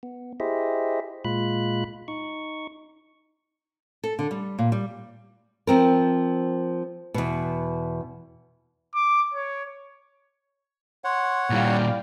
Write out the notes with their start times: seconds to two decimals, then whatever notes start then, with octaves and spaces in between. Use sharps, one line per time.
0.03 B3
0.40 E4 G4 G#4 C5 D#5 E5
1.25 A#2 G#3 F4 B5 F#6
2.08 D#4 C#6
4.04 A4
4.19 D3
4.31 G3
4.59 A#2
4.72 G3
5.67 F3 C4 A#4
7.14 E2 B2
8.95 D6
9.34 C#5
11.04 C#5 F#5 C6
11.50 A#2 G3 E4 D5 F5 G5